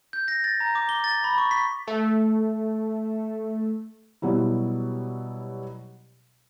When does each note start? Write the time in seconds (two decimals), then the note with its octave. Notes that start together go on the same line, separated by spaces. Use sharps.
0.13 G6
0.28 A#6
0.44 A6
0.60 A#5
0.75 D6
0.89 G7
1.04 A6
1.24 B5
1.38 C#6
1.51 B6
1.87 A3 A4
4.22 B2 F#3 G3 E4